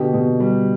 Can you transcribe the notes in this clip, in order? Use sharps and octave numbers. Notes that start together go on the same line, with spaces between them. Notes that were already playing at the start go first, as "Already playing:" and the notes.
Already playing: B2 D3 G4
B2
G3